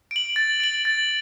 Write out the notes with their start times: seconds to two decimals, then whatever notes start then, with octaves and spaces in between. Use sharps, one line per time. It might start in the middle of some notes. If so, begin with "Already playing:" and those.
0.11 D7 F#7
0.36 A6
0.60 D7 F#7
0.85 A6